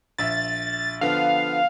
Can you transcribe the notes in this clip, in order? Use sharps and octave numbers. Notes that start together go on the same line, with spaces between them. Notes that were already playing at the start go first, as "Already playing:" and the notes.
A#1 E5 A6
D3 F3 B3 F5